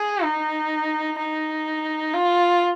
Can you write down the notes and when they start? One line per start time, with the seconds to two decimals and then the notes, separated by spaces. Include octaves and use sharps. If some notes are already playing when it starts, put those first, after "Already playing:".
Already playing: G#4
0.23 D#4
1.18 D#4
2.13 F4